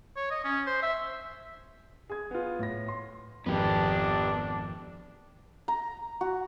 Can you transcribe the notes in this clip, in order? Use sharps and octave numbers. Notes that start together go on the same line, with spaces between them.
C#5
D#5
C#4
C5
E5
G#4 G#6
B3 F4
A2 A#6
C6
G#1 F2 B3 D4 G4
A#5
F#4